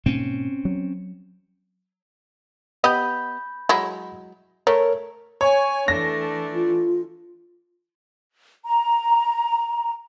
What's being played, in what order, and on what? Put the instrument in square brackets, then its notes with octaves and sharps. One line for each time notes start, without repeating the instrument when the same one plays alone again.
[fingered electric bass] G#2 B2 A#3 [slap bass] C4 C#4
[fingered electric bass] F#3
[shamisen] B3 G4 D#5 [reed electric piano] B5 G6
[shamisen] F#3 G#3 E4
[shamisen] A3 [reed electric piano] A#4 C#5
[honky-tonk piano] C#5 [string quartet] G#5
[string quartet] E3 A3 D4 [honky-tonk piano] A#6
[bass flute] F4
[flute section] A#5